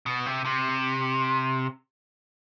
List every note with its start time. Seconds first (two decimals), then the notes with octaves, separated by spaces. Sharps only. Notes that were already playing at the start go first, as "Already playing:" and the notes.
0.06 B2
0.26 C3
0.45 C3